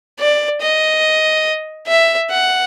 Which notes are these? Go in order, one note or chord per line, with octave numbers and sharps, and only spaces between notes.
D5
D#5
E5
F#5